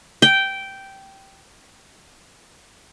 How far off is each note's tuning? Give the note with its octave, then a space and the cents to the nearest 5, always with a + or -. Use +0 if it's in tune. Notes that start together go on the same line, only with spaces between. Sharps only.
G5 -10